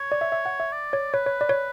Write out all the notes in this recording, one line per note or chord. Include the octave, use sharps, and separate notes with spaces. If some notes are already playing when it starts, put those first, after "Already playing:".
Already playing: C#5
D5
E5
E5
F#5
E5
D5
C#5
B4 C#5
C#5
D5
C#5